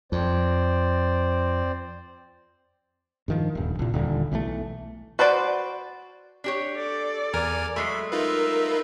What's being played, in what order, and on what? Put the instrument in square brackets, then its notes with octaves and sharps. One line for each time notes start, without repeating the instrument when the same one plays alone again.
[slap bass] F2 [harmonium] C4 C5 D5
[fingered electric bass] G2 D#3 F3
D#1 G2
C2 A#2
D#1 D3 F3 G3
B1 E3 G3 A3
[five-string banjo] F#4 B4 C5 D5
[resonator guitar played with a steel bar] D4 G4 C#5
[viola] A4 D5
[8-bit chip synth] E2 G#5 F6 [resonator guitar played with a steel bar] A#4
[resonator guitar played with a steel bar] F#3 G#3 A3 [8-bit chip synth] B5
[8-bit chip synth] D#4 F4 B4 [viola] A#4 E5